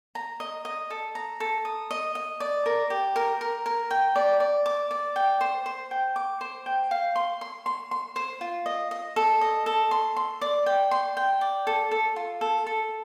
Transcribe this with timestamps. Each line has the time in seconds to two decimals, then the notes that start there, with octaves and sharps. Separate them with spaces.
0.15 A#5
0.40 D#5
0.65 D#5
0.90 A4
1.15 A#5
1.40 A4
1.65 D#6
1.91 D#5
2.15 D#5
2.40 D5
2.66 A#4
2.90 G4
3.16 A#4
3.41 A#4
3.66 A#4
3.91 G5
4.16 D5
4.40 D5
4.66 D6
4.91 D5
5.16 G5
5.41 C5
5.66 C5
5.91 G5
6.16 D6
6.41 C5
6.66 G5
6.91 F5
7.16 C6
7.41 C6
7.66 C6
7.91 C6
8.16 C5
8.41 F4
8.66 D#5
8.91 D#5
9.16 A4
9.41 D#5
9.66 A4
9.91 C6
10.16 C6
10.41 D5
10.66 G5
10.91 C6
11.17 G5
11.41 D5
11.67 A4
11.91 A4
12.16 F4
12.41 A4
12.67 A4